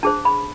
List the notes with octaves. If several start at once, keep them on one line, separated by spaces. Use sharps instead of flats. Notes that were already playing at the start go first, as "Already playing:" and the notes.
D4 G#4 C5 A5
B5